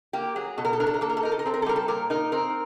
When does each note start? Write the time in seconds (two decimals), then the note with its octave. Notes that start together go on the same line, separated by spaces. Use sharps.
0.13 A#3 G4
0.36 F#3 G#4
0.58 B2 A4
0.65 A#4
0.73 A4
0.80 D4 A#4
0.87 A4
0.94 A#4
1.01 A#3 A4
1.10 A#4
1.17 A4
1.23 D#4 A#4
1.32 A4
1.39 A#4
1.46 C4 A4
1.54 A#4
1.62 A4
1.66 G3 A#4
1.76 A4
1.88 A#2 A#4
2.10 D#4 A#4
2.32 C4 A#4